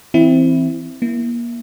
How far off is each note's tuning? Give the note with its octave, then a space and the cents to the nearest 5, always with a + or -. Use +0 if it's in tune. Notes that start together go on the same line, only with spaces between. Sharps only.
E3 +0 C4 +0 E4 +0
A#3 +30 E4 +0